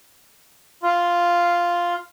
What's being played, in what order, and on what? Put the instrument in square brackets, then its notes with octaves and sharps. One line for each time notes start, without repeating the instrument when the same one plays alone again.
[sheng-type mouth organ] F4